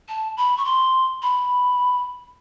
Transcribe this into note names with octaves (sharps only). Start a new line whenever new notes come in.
A5
B5
C#6
C6
B5